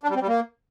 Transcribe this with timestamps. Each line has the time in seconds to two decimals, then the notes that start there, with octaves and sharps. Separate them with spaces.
0.03 D4
0.10 G3
0.16 C4
0.22 G3
0.28 A#3